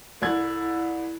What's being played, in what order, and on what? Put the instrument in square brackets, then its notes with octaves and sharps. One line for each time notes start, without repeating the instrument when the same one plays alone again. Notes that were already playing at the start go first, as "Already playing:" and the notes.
[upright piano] C2 F#6 G#6 [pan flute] E4 [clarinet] A4